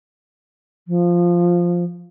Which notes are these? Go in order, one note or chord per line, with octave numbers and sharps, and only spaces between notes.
F3